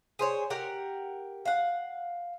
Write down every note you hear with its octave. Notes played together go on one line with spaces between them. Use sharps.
G#4 C5 C#5
G4 A#4 F#5
F5 F#5